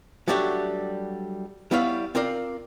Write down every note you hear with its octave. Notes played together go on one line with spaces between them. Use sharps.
F#3 G3 A3 D4 F#4 G4
G3 B3 E4 C#5 F5
C4 F4 A#4 D5